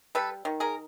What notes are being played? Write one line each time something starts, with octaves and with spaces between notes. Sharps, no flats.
G3 A4 B4
D#3
G#4 A#4